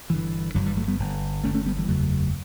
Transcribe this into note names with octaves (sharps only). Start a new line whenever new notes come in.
G1 G2 D3 E3
G1 G2 D3 F#3
E3 G3
F#3 A3
G3 B3
G1 G2 D3
G1 G2 D3 A3 C#4
A3 C#4
G3 B3
E3 G3
F#1 E2 C#3 F#3 A3